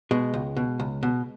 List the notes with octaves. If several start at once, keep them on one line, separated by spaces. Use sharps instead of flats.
B2 G#3
C#2
B2
C#2
B2